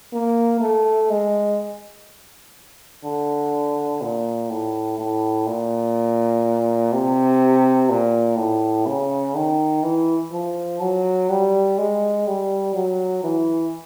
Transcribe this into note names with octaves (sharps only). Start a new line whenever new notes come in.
A#3
A3
G#3
D3
A#2
A2
A2
A#2
C3
A#2
A2
C#3
D#3
E3
F3
F#3
G3
G#3
G3
F#3
E3